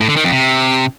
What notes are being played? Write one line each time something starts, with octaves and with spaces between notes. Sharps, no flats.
A2
D3
D#3
F2
C3